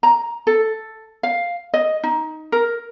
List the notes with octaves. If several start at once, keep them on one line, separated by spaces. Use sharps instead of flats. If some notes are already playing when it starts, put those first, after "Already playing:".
A#5
A4
F5
D#5
D#4
A#4